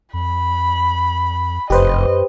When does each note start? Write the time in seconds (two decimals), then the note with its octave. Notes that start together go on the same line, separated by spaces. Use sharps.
0.13 F2 B5
1.70 F1 F#2 G4 B4 C5 D#5